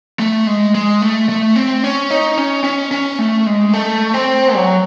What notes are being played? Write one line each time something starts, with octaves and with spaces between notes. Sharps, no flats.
A3
G#3
G#3
A3
A3
C4
C#4
D#4
C#4
C#4
C#4
A3
G#3
A3
C4
F#3